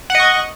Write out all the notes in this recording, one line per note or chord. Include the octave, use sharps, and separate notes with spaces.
D#5 F#5 C#6